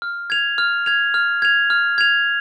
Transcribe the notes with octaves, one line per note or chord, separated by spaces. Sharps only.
F6
G#6 F7
F6
G#6 F7
F6
G#6 F7
F6
G#6 F7